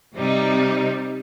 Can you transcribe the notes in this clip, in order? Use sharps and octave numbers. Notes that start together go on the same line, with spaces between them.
C3 G3 D#4